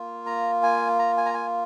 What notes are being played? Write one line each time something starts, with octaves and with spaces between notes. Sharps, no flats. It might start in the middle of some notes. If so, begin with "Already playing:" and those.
Already playing: A#3 F4
A#5
G#5
A#5
G#5
A#5
G#5